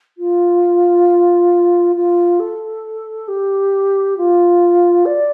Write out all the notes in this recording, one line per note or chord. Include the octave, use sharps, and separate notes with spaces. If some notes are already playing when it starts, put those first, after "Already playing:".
F4
F4
A4
G4
F4
D5